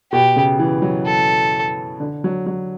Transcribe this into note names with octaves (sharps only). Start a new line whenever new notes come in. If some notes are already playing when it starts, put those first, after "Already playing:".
B2 G4
C#3
E3
F#3
A4
D3
F#3
F#3